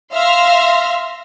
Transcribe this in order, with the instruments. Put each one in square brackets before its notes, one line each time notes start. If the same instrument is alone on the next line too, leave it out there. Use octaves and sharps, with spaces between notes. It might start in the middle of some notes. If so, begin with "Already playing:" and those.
[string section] E5 F5 C6 F6 A#6